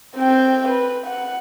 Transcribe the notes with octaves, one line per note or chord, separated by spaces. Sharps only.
C4 G5
B4
F#5